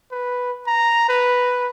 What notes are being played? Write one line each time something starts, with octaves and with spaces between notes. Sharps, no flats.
B4
A#5
B4